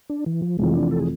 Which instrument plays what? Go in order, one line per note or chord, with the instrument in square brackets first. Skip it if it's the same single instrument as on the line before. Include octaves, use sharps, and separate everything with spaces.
[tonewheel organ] D4
E3
F3
[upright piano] F1 F2 E3 [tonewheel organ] G#3
[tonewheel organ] D4
A4
G#4